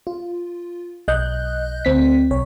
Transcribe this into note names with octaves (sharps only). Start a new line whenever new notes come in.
F4
B1 D#5 F#6 G6
D2 C4 B6
B1 C#5